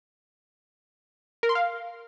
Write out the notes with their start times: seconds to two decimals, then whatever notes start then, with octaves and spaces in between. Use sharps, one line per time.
1.43 A#4
1.49 C6
1.55 F5